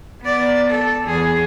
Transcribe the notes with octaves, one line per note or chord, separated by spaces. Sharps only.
B3 D5
A4
E2 G#4